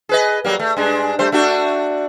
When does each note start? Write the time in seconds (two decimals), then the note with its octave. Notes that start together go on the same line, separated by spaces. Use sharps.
0.09 G#4 B4 D#5
0.44 F#3 G3 A#3
0.59 A3
0.77 G2 G#3 D4
1.19 G3 A3 C5
1.32 A3 D4 F#4